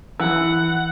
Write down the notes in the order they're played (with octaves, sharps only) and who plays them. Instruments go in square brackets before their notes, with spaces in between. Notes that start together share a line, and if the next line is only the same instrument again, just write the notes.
[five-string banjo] E3 [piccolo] F#5